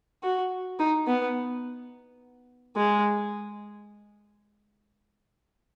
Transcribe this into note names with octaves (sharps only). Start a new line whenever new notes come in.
F#4
D#4
B3
G#3